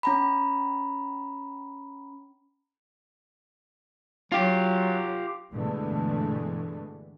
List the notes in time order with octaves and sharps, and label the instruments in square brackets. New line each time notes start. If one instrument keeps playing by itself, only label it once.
[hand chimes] C#4 A#5 B5
[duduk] F#3 [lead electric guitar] F4 G4
[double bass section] G2 B2 D3 E3 G#3 A3